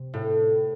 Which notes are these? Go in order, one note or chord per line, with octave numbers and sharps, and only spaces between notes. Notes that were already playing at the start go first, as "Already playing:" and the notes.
Already playing: C3
A2